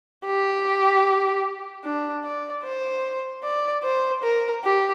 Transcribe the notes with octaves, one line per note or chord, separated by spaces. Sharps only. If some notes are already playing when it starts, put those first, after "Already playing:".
G4
D4
D5
C5
D5
C5
A#4
G4